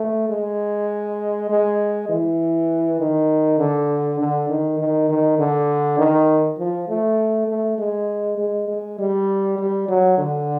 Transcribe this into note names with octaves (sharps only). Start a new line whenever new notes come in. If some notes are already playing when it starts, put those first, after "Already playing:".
Already playing: A3
G#3
G#3
E3
D#3
D3
D3
D#3
D#3
D#3
D3
D#3
F3
A3
A3
G#3
G#3
G#3
G3
G3
F#3
D3